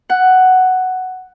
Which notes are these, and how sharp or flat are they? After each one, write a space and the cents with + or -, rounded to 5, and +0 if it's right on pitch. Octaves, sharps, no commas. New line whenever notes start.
F#5 +5